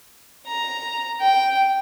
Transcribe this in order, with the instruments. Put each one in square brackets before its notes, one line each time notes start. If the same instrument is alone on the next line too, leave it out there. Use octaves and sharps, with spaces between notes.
[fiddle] A#5
G5